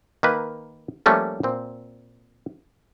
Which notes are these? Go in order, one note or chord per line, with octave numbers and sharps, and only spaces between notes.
D#3 A#3 B4
F3 G3 A3 A#3 C#4
A#2 C4